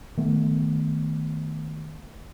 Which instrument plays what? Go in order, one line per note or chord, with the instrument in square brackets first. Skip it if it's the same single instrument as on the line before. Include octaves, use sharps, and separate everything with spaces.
[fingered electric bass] D#3 A3 B3